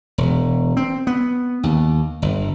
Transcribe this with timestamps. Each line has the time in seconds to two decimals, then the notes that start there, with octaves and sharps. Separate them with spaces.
0.18 E1
0.77 C4
1.07 B3
1.63 D#2
2.22 G1